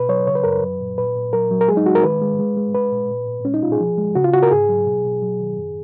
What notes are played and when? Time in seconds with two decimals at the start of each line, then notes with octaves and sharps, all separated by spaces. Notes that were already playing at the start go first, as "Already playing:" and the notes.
Already playing: B2 B4
0.09 F#3 C#5
0.27 C#3 C#5
0.35 B4
0.44 F#2 A#4
0.51 B4
0.62 F#3
0.80 A#2
0.98 A#2 B4
1.16 A#2
1.33 F#3 A#4
1.51 F#3
1.61 A#4
1.68 G#3 G#4
1.77 D#4
1.86 G#3 F#4
1.95 A#4
2.04 D#3 B4
2.22 G#3
2.39 G#3
2.57 G#3
2.74 G#3 B4
2.92 A#2
3.10 A#2
3.28 A#2
3.45 G#3 C#4
3.54 D#4
3.63 B2 F4
3.72 G#4
3.80 F3
3.98 G#3
4.15 C#3 F#4
4.24 F4
4.33 C#3 F#4
4.43 A#4
4.51 G#2 G#4
4.69 F#3
4.86 B2
5.04 B2
5.22 F#3
5.40 D#3
5.57 F#2